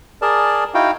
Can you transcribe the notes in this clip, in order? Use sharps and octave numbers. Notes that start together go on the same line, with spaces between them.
G#4 A#4 D5 A5
D#4 E4 F#4 F5 G5